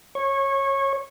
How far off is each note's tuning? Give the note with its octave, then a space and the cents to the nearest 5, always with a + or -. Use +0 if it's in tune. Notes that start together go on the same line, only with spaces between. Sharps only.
C#5 -20